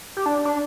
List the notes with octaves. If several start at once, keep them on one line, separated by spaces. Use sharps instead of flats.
G4
D4
D4